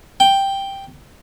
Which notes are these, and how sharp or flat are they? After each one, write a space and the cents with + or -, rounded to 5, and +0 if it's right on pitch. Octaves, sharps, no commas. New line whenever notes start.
G5 +0